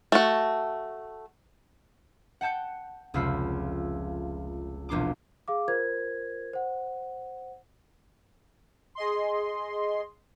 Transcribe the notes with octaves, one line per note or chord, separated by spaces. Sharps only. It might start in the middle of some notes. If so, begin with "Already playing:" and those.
A3 F#4
F#5 G5 A5 G6 C#7
F1 C#2 F4 B5 E6 C7
E1 A#1 D4 C6 D6
G#4 F5 D6
F4 A#4 C5 G#6
C5 F#5
G#4 D#5 C6